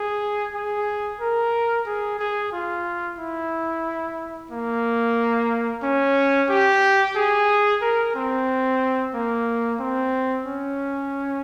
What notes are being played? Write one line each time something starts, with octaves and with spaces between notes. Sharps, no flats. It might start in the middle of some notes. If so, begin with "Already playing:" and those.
Already playing: G#4
G#4
A#4
G#4
G#4
F4
E4
A#3
C#4
G4
G#4
A#4
C4
A#3
C4
C#4